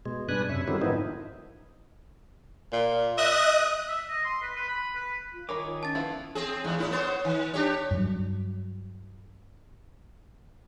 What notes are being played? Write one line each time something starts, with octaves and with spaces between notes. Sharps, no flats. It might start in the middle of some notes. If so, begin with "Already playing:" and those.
B2 G#3
G2 D4 B4 G#5 F#6
F#2 C3 C#4 E5
D3 D#3 F#3 G3 C4 E4
G#2 D#3 F3 B3 D#4 E4
A#2
D#5 E5 D#6 F#6
E5
D#5
C6
B4
B4
B5
B4
F4
D#3 G#4 A#4 C#5 B5 D6
C#4 A5 A6
F3 B3 E4
C4 G#4
E2 G#2
A2 E4
B3 C5 C#5
D#3
D4 G4 C#5
G2 F#3